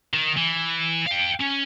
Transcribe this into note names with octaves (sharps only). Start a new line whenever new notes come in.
D#3
E3
F5 G5
C#4